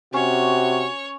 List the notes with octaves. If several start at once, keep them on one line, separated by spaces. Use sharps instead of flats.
C3 C#4 F#4 C#5